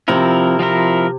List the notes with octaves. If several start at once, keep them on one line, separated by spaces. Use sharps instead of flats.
C3 F3 C4 E4 A#4
F3 C4 E4 A#4